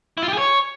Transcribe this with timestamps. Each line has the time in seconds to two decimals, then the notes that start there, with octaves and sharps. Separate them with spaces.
0.18 E4
0.23 F4
0.28 G4
0.33 G#4
0.38 C#5